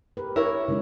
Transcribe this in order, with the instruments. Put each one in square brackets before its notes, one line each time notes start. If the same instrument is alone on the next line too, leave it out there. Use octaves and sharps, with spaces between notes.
[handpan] G4 A#4 B4
[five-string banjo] E4 A#4 [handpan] C#5
[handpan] C#3 G#3 D#4